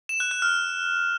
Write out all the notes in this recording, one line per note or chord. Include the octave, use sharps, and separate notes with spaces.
E7
F#6
F#6
F6